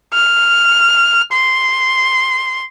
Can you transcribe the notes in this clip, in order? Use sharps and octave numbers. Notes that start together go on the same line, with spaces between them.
F6
C6